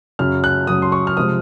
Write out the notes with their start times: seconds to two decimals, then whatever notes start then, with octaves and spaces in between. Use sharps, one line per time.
0.19 F#2 C#3 F#3 F6
0.44 F#6
0.67 F#2 C#3 F#3 D#6
0.82 C6
0.92 C#6
1.07 F6
1.17 C3 F3 G#3 C4 D#6